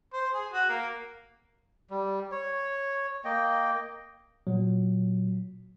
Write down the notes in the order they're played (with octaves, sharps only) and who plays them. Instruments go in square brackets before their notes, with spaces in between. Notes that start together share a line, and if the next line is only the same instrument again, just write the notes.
[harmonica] C5
G#4
F#4
A#3
[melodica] G3
C#5
A#3 D#5 G5
[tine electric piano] A#2 F#3